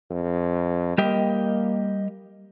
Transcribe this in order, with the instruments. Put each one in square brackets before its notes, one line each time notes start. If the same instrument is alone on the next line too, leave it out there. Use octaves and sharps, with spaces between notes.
[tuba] F2
[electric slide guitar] G3 G4 D#5 [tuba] A#3